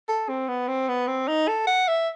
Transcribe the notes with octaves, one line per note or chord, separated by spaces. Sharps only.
A4
C4
B3
C4
B3
C4
D#4
A4
F#5
E5